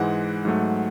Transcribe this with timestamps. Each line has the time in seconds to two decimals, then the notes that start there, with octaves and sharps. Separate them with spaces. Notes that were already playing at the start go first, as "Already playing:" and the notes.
Already playing: G#2 E3 G#3 F#5
0.45 G#2 F#3 A3